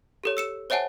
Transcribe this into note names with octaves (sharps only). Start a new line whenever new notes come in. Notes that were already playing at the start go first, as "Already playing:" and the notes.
G4 A4 C#5
E6 C#7 E7
C5 C#5 E5 F#5 G#5 A5